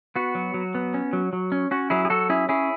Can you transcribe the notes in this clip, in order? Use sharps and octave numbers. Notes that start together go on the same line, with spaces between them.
B3 F#4
F#3
F#3
B3
C#4
F#3
F#3
C#4
C#4 F#4
F#3 E4 G#4
G#4
F#3 F#4 A4
C#4 E4 G#4
C#4 E4 G#4